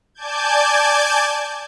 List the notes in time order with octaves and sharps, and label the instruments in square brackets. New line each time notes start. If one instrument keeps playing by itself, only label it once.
[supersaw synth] D5 G#5 A5 D6 G6 G#6